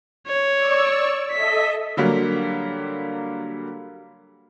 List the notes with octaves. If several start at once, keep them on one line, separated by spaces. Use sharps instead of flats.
C#5
D5 C#6 E6
A4 D#5 E5 B6
D3 F#3 G3 A#3